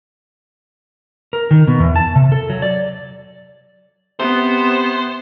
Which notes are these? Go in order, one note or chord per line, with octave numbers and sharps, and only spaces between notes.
A#4
D#3
B2
E2
A5
C3
A4
F#3
D5
C3 B3 C5